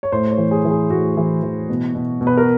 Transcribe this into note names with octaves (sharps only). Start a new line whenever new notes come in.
C#5
A2 C5
C#5
E3
G#4
E3
G#4
A2 F#4
E3
E3
B2
B2
B2
B4
A#4